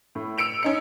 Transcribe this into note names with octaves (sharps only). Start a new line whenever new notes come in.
A2
E6 C#7 D7 F7
C#4 D#4 C#7